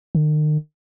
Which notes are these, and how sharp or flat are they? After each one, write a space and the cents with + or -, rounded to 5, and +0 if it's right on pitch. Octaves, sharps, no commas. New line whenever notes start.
D#3 -40